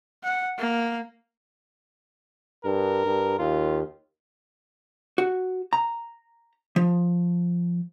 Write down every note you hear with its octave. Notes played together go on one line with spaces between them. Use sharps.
F#5
A#3
G2 A#4
G2
D#2 F4
F#4
A#5
F3